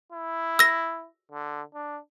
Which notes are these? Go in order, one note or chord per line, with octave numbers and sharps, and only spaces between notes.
E4
E6 A#6
D3
D4